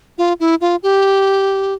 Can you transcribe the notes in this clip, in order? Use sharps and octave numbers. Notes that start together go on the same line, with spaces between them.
F4
E4
F4
G4